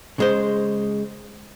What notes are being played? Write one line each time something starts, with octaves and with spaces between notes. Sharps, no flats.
C#3 G#3 C5